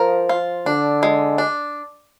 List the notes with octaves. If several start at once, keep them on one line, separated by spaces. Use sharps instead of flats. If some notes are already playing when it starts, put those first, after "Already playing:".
Already playing: F3 A#4
F4
D3 D4
G#3
D4